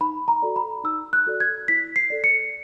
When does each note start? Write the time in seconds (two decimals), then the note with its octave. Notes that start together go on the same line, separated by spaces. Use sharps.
0.01 D#4 B5
0.28 A#5
0.42 F#4 A4 D5
0.56 B5
0.84 D#4 E6
1.13 F#6
1.26 F#4 A4 D5
1.40 G#6
1.68 E4 B6
1.96 C7
2.10 A4 D5
2.24 C#7